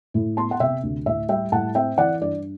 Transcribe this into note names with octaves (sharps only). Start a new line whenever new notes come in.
A2
B3 A5 C6
F#5
C3 E5 G5
D2
A2 E5
G3 E5 G5
A2 F#5 A5
C4 E5 G5
E3 D5 F#5
G2 D5